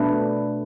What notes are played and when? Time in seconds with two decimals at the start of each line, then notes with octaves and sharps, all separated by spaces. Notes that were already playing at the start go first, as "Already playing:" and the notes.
Already playing: B2 A3 D4 B4